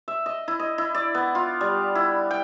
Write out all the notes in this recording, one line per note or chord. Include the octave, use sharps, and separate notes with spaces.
E5
D#5
E4
D#5
E4
D5
B3
F4
G3
E4
G5